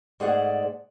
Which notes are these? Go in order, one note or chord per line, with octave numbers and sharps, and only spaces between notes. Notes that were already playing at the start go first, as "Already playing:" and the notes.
G#2 A3 G#4 C5 D5 F#5